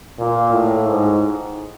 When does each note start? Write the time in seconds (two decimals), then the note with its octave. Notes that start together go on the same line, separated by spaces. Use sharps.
0.19 A#2
0.53 A2
0.87 G#2